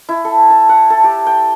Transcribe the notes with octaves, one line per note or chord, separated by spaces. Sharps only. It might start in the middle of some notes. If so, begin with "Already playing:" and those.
E4
A4
A5
F#5
A4
G4
G5